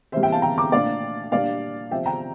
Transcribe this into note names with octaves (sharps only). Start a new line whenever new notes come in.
C3 E3 G3 A#3 C5 E5
E5 G5
F5 A5
G5 A#5
A#5 D6
A#2 A3 D4 D5 F5
A#2 G3 A#3 D4 D5 F5
C3 F3 C4 E5 G5
G5 A#5